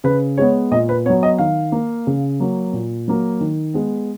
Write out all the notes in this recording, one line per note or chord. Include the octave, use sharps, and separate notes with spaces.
C#3 B4
G#3 B3 C#5
A#2 D#5
B4
F#3 B3 C#5
D#5
D#3 F5
A#3
C#3
F#3 A#3
A#2
F#3 A#3
D#3
G#3 B3